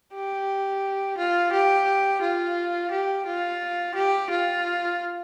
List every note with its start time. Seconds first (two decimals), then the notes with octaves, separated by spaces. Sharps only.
0.13 G4
1.18 F4
1.52 G4
2.22 F4
2.91 G4
3.26 F4
3.95 G4
4.30 F4